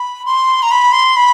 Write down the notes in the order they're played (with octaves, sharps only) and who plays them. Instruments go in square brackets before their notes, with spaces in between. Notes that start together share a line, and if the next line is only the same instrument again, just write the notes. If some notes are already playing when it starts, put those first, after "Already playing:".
Already playing: [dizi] B5
C6
A#5
B5
C6
B5